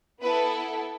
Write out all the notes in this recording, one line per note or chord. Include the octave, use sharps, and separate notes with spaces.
B3 E4 A4 B4